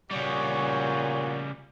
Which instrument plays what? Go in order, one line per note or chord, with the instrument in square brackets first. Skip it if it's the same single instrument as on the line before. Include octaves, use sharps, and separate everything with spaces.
[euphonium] A#2 [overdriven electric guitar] C#3 G3 [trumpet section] F#4 G#4 C#5